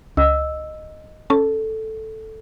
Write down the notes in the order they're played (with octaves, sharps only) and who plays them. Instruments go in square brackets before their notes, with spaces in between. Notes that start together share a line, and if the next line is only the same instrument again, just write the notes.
[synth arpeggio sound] C#2 [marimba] D#5 E6
[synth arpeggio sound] C#4 A5 [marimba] A4